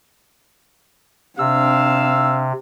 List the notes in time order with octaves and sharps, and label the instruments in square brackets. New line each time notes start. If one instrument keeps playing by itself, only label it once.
[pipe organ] C3 [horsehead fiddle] C4 D4 [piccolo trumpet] F5 [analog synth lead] E6